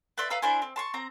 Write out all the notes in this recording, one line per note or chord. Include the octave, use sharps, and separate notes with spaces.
B4 D5 E5 C6
B4 F5 A#5 E6
D4 E4 C5 G#5
C4
A5 C6 C#6
C4 A#5